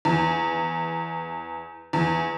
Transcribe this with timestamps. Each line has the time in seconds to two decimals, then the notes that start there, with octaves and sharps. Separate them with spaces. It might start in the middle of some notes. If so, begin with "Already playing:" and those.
0.05 E2
1.93 E2